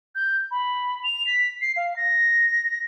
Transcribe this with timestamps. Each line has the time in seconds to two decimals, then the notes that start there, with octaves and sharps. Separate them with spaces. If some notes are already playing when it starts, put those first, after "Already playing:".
0.15 G6
0.51 B5
1.04 F7
1.27 B6
1.61 C7
1.76 F5
1.96 A#6